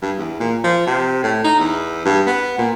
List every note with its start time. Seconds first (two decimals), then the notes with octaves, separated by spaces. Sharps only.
0.02 G2
0.18 E2
0.40 A#2
0.64 F3
0.87 C3
1.23 A2
1.44 D#4
1.59 E2
2.05 G2
2.27 B3
2.58 A#2